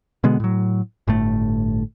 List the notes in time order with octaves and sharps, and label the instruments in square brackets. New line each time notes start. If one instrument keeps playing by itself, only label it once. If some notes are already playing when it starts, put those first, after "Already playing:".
[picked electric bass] B2 D3 G#3 B3
A2 F#3
G1 A2 A3